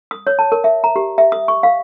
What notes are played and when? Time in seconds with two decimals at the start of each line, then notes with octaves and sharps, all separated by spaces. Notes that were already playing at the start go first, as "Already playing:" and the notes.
0.11 D#6
0.27 C#5
0.39 A5
0.52 A#4
0.64 E5
0.84 A#5
0.96 G4
1.18 E5
1.32 D#6
1.48 C#6
1.63 F5